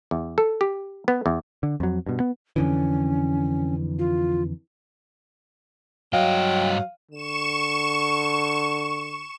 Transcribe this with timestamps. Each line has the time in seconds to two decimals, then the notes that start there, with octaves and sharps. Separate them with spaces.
0.11 E2
0.38 A4
0.61 G4
1.08 B3
1.26 E2
1.63 D3
1.80 F2 F#3
2.06 G2 B2
2.20 B3
2.56 F2 D3 E3 C#4
3.99 F4
6.13 G2 F#3 D#5 F5 G5
7.12 D3 C#6 E7